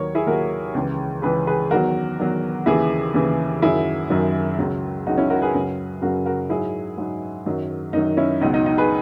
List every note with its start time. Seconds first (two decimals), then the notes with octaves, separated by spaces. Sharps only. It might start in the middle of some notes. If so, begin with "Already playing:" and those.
Already playing: D#2 D#3 F#3 A#4 C#5
0.15 E4 G#4
0.26 D#2 D#3 F#3 F#4 A#4
0.74 C#2 C#3 E3
1.22 C#2 C#3 E3 G#4 B4
1.47 G#4 B4
1.70 E2 D#3 F#3 F#4 A#4
2.19 E2 D#3 F#3
2.66 D#2 C#3 E3 E4 G#4
3.14 D#2 C#3 E3
3.62 F#2 D#3 F#3 E4 G#4
4.10 F#2 D#3 F#3
4.58 C#2 C#3 F#3
5.06 C#2 C#3 F#3 D#4 F#4
5.18 C#4 E4
5.30 F#4 A#4
5.42 G#4 B4
5.55 F#2 C#3 F#3
6.01 F#2 C#3 F#3 F#4 A#4
6.26 F#4 A#4
6.50 G#2 F#3 E4 G#4
6.98 G#2 F#3
7.46 F#2 D#3 F#3
7.93 F#2 D#3 F#3 D#4
8.17 C#4 E4
8.41 C#2 B2 F#3 D#4
8.54 D#4
8.66 D#4
8.78 G#4 B4